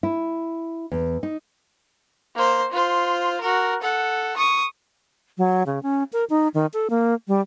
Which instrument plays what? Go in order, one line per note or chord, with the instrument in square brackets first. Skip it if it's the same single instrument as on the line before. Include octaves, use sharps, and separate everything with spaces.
[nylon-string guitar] E4
E2
D#4
[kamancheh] A#3 C5
F4 C5
F#4 A#4
A4 F#5
C#6 D#6
[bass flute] F#3
C#3
C#4
A#4
D#4
D#3
A4
A#3
G3